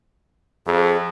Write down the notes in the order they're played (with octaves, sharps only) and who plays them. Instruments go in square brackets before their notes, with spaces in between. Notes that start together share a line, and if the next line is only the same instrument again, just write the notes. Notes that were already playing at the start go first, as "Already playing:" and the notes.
[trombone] F2 [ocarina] G#4